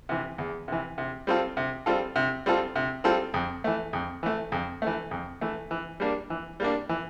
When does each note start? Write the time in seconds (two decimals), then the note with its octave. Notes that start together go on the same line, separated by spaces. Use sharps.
0.09 C3 E3
0.38 E2
0.68 C3 E3
0.98 C3
1.27 G3 C4 F4 A4
1.57 C3
1.86 G3 C4 F4 A4
2.16 C3
2.46 G3 C4 F4 A4
2.76 C3
3.04 G3 C4 F4 A4
3.34 F2
3.64 E3 A3
3.93 F2
4.23 E3 A3
4.52 F2
4.82 E3 A3
5.11 F2
5.41 E3 A3
5.71 E3
6.00 G3 A#3 D4
6.30 E3
6.60 G3 A#3 D4
6.89 E3